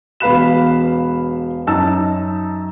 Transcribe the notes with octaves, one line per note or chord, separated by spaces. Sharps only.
E1 B4 F5 B5 F#6 E7
F#2 D#4 A5 E6